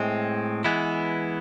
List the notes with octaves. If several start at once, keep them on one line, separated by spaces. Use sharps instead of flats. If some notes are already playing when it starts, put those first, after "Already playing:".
Already playing: A2 G#3 C4
E3 G#3 B3 E4